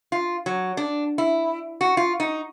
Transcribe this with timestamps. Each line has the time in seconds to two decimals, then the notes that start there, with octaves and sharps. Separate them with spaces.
0.12 F4
0.46 F#3
0.77 D4
1.18 E4
1.81 F#4
1.97 F4
2.20 D#4